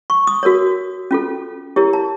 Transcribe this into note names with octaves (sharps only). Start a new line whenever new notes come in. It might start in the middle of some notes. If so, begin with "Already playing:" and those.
C#6
D#6
F#4 A#4 C#5
C#4 F4 A4
E4 G4 A#4 C#5
A5